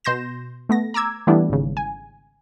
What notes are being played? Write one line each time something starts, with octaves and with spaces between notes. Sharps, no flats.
B2 C6 G6 A#6 E7
A3 B3 A#6
A#5 D6 E6 G#6
E3 G3 A3 B3 D4 E4
G#1 C#3
G#5